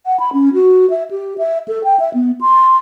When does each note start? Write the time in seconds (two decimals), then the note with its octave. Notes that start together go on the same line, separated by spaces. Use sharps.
0.06 F#5
0.20 B5
0.33 C#4
0.54 F#4
0.90 E5
1.11 G4
1.38 E5
1.68 A4
1.84 G5
2.00 E5
2.14 B3
2.41 C6